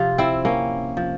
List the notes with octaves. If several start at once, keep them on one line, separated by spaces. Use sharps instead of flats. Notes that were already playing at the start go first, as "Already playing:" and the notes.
Already playing: C3 F3 F4
C4 E4
A#3 C#4
F3